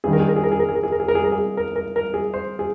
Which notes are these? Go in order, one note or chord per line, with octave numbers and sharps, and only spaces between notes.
G2 D#3 G#4
A#4
G#4
A#4
G#4
A#4
G#4
A#4
G#4
A#4
G#4
A#4
G#4
A#4
G#4
A#4
G#4
A#4
A#4
A#4
G#4
C5
G#4